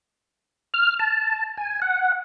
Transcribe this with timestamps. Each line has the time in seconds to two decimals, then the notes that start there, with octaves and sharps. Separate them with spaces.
0.74 F6
0.99 A5
1.57 G#5
1.82 F#5